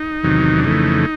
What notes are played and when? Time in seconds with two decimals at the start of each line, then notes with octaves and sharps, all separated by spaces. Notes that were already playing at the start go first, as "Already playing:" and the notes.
Already playing: D#4
0.23 E2 C3 D#3 F#3
0.58 D4
0.64 F2 C#3 E3 A3 D#4